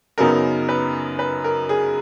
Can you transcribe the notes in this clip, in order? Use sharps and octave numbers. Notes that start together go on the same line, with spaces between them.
F#2 C#3 F#3 B3 D#4 A#4
B4
B4
A#4
G#4